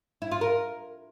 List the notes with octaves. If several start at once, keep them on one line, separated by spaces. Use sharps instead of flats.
E4
F4
A#4